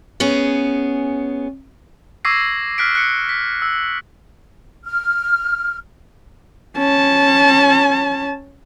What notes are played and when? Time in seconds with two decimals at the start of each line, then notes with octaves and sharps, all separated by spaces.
0.20 B3 C#4 G#4
2.25 C#6 D6 E6 G#6 A#6 C7
2.78 F6 F#6 B6 D7
2.95 F#6 C#7
3.29 B6
3.62 E6
4.85 F6
6.77 C#4 A5